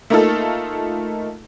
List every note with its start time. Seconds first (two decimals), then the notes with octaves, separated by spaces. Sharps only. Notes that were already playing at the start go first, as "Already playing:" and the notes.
0.10 A3 A#3 D#4 F4 A4